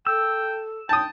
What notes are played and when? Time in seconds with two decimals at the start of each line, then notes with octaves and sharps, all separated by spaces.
0.07 A4 G5 E6
0.89 G5 A5 D#6